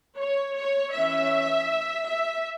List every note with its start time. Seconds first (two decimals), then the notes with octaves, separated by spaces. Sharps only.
0.18 C#5
0.56 C#5
0.93 E3 C#4 E5
2.06 E5